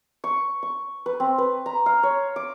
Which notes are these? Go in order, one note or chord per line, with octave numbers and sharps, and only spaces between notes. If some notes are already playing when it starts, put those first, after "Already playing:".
C#6
C#6
B4
C4
B4
A#5
F5
C#5
D6